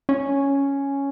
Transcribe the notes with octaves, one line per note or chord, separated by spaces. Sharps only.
C#4